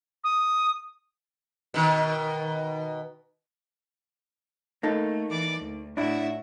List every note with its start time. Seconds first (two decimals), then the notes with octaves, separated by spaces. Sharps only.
0.24 D#6
1.74 B2 D#3
4.83 A3 A#3 D#4 A4
5.31 E3 D5 D6
5.60 D2
5.97 A2 D4 E4 F#4 E5